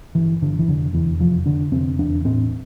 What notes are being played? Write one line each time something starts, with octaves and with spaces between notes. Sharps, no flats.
G1 E3
G1 D3
E3
F1 D3
E2 E3
F1 F3
D3 D4
F1 C4
E2 D4
A2 C4